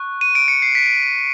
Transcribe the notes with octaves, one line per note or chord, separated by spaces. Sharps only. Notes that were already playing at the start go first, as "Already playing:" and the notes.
Already playing: C#6 F#6
D#7
D7
C#7
C7
B6